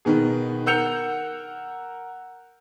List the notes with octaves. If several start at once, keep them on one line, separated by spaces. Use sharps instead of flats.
B2 D#3 B3 G#4
A#4 F#5 E6 G6 C#7 F7